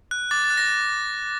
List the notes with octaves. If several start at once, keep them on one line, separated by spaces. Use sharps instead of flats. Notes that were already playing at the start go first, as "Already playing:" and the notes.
F#6
D6 A6
A6
F#6
A#6